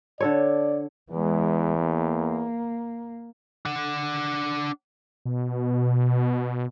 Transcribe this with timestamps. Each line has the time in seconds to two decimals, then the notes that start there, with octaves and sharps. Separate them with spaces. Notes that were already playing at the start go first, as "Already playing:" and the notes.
0.20 D3 A4 C#5 D5
1.11 E2 E3 G#3
1.81 A#3
3.65 D4 F#5
5.25 B2